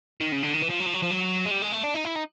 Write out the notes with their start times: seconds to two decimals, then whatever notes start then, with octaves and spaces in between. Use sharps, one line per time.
0.21 D#3
0.32 C#3
0.43 D3
0.54 D#3
0.62 E3
0.69 F3
0.80 F#3
0.86 F3
0.93 F#3
1.02 F3
1.11 F#3
1.45 G#3
1.51 G3
1.62 G#3
1.72 A3
1.83 D4
1.94 D#4
2.04 E4
2.15 D#4